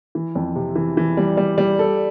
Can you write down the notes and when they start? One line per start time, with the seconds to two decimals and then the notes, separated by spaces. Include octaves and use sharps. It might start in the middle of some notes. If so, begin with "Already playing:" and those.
0.15 E3
0.35 F2
0.56 C3
0.76 E3
0.97 E3
1.17 G3
1.37 G3
1.58 G3
1.79 A4